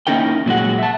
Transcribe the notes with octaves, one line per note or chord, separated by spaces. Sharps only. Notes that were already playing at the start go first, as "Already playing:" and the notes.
A#3 C#4 D#4 E4 A#4 G5
A#2 F#3 G#3 F#5
E5 A5